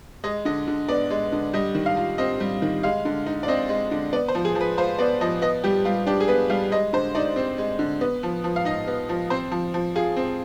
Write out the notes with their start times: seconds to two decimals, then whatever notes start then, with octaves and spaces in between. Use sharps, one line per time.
0.24 G#3 D#5
0.45 D3 D#5
0.67 D3
0.89 B3 D5
1.10 G#3
1.32 D3
1.53 G3 D#5
1.75 D#3
1.86 F5
1.97 F4
2.18 C4 D#5
2.40 G3
2.62 D#3
2.83 G#3 F5
3.05 D3
3.26 D#4
3.43 D5
3.48 C4 D#5
3.69 G#3
3.91 D3
4.13 B3 D5
4.28 C5
4.35 F3
4.45 G#4
4.55 F3
4.61 B4
4.78 F4 C5
4.99 B3 D5
5.21 F3 D#5
5.42 B3 D#5
5.64 G3 G4
5.85 G3 F4
6.07 D4 G4
6.20 G#4
6.28 B3 B4
6.49 G3 F5
6.72 G#3 D#5
6.93 D3 C5
7.15 D#4 D5
7.36 C4
7.58 G#3
7.79 D3
8.01 B3
8.23 F3
8.44 F3
8.56 F5
8.65 D#4 D#5
8.88 B3
9.09 F3
9.30 C4 C5
9.52 F3
9.74 F3
9.96 F4 G#4
10.17 C4